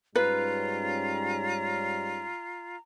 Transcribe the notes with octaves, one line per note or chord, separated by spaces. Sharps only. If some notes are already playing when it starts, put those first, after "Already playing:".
G#2 G3 C#4 F4 B4 A#5